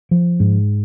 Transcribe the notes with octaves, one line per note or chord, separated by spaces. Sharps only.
F3
G#2